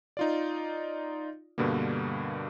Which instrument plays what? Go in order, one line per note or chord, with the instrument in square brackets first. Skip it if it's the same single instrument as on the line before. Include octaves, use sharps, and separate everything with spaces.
[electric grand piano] D#4 F4 D5
G2 B2 D3 G3 A#3